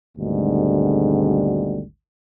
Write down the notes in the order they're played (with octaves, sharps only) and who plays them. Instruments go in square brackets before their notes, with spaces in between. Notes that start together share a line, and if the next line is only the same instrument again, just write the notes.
[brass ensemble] G#1 D2 G#2 B2 D3 G3